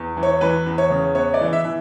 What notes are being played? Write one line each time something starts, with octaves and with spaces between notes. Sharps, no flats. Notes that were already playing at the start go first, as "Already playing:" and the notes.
Already playing: E2
E3
C#5
E3 B4
E2
C#5
C#3
B3 C#5
D5
E3
E5
E3